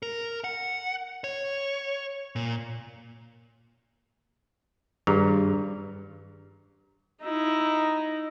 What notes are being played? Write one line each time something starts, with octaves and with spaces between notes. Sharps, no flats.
A#4
F#5
C#5
A#2
G2 D#3 G#4 A#5
D#4 E4